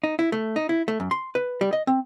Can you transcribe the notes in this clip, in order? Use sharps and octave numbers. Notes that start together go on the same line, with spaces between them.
D#4
E4
A3
D#4
E4
A3
F#2
C6
B4
G3
D#5
C4